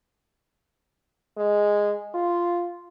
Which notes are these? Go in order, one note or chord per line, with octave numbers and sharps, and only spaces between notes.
G#3
F4